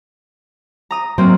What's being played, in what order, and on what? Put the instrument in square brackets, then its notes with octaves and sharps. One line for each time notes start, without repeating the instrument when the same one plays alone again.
[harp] A#5 D#6
[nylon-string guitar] F#3 [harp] A#3 C4